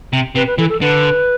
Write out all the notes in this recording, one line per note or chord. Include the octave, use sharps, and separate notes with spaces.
C3
C3 B4
B4
E3 A4
A4
D3 B4